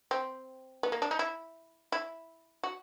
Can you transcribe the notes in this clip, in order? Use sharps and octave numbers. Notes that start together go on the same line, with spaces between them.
C4
B3
A#3
D4
D#4
E4
E4
F#4